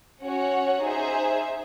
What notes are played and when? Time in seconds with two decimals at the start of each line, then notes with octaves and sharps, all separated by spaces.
0.24 C#4 F#4 C#5 F#5
0.84 D#4 G#4 C5 E5